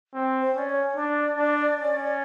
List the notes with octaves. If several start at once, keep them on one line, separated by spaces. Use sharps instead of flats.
C4
C5
C#4 D5
C#5
D4 D5
D4
C#4